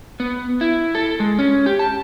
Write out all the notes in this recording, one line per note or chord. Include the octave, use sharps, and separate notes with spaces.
B3
E4
A4
G#3
C#4
G4
A5